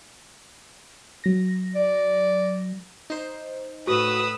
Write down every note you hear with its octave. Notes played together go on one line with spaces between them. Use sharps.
F#3 A#6
D5
D#4 C5
A2 F#4 B4 D#6 E6